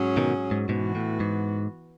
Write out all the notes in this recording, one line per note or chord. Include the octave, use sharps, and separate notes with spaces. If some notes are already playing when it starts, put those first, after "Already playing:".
Already playing: G#2 F#3 C#4 G#4
B2 D#3
G#2
G#2 B2 E3 B3 F#4
A2
G#2